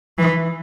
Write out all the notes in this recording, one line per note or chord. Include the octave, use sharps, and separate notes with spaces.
E3